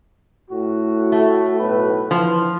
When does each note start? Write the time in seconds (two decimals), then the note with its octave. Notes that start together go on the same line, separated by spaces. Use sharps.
0.50 A2 F#4
1.12 A3
1.59 B1 A2 B4
2.11 E3 F3